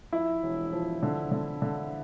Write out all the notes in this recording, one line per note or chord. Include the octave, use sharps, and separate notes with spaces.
F3 E4
E1
F3
D3
D3
D3